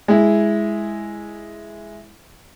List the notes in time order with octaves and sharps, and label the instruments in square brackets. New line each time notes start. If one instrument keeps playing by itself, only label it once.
[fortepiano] G#3 E4